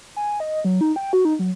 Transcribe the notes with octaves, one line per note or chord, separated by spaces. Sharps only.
G#5
D#5
F#3
D#4
G5
F#4
D#4
F#3